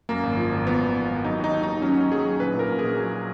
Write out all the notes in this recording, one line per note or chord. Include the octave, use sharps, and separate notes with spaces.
F#2 A#3
G#1
F3
G#1
F3 B3
G#1
F3
G#1
F#3 D#4
D#2
D#4
D#2
D#3 D#4
F#3 C#4
F#3
F#3 G#4
F#3
A#1 B4
A#2 A#4
A#2
A#1 G#4
F#3